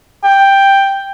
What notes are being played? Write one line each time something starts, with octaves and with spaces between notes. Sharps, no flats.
G5